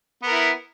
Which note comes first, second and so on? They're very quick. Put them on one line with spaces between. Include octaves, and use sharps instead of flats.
B3 A#4 E4